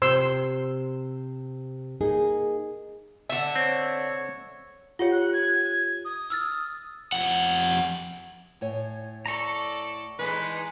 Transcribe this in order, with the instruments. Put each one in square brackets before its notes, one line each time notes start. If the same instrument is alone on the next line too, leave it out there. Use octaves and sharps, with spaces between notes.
[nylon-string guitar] C3 [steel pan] C5 C6 E6
[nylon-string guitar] A#3 D#4 G#4
[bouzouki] D3 E5
[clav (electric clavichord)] C4 [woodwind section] C#5
[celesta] F4 G4 C#5 [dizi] F#5
[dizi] F#6
G#6
D#6
[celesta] E6 F6 A6
[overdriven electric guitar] F2 F#5
[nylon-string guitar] A2 C#5 G#5
[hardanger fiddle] A4 D5 [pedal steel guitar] A#5 C#6
[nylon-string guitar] E3 A4 [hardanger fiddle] G#3 D#4 [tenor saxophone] B4